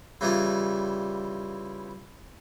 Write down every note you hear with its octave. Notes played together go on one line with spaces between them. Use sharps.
C#3 E3 G3 F4